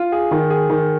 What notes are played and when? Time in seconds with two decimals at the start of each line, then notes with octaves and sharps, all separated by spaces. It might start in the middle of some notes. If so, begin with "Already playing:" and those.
Already playing: F4
0.12 G#4
0.31 D#3
0.50 G#4
0.70 D#3